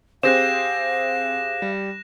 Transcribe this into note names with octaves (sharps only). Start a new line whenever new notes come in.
C4 G4 G#4 C5 F5 F#6 A#6 E7
G3